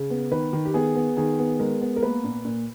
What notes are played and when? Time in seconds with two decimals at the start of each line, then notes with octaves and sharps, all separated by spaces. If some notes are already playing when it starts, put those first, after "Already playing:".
Already playing: C#3
0.10 B3
0.31 D#3 B4
0.53 D#3
0.65 G4
0.74 B3 G#4
0.95 B3
1.17 D#3 G#4
1.39 B3
1.59 G#3 A#4
1.81 B3
1.96 A#4
2.03 A#3 B4
2.24 A#2
2.45 A#2